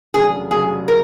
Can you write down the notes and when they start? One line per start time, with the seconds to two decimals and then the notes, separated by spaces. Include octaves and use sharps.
0.14 F1 E2 C#3 F#3 G#4
0.51 F1 E2 C#3 F#3 G#4
0.88 C#3 A#4